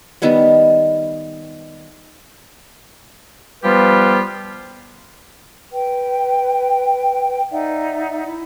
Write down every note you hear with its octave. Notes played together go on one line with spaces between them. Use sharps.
D#3 G3 B3 F#5
F3 G3 B3 F4 G4 B4
B4 G5
D#4 D5 E5 F#5
E4